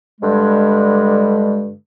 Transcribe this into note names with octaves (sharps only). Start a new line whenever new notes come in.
G2 D3 G3 G#3